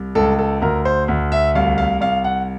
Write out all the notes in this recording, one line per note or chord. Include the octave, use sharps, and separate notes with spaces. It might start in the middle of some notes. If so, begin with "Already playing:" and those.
Already playing: C2
C#2 A4
A4
D2 A#4
C5
D2
E5
C2 F5
F5
C2 F5
F#5